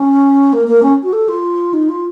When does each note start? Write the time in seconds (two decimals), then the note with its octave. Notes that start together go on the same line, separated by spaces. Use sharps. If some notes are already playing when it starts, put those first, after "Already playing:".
Already playing: C#4
0.53 A#3
0.68 A#3
0.82 C#4
1.03 F#4
1.13 A4
1.28 F4
1.73 D#4
1.89 F4